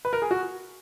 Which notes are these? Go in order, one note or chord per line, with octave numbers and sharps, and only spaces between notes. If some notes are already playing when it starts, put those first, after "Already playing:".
B4
A#4
G#4
F#4